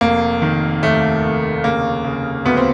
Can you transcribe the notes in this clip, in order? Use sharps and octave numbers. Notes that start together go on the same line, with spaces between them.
F1 A#3
D#3
D#2 A3
F1
C#3 A#3
C#3
D2 B3
C4